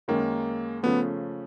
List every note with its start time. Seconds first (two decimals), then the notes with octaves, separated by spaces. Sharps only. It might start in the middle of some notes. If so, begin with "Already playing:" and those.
0.08 F#2 D#3 G#3 A#3
0.83 C#3 F3 A3 B3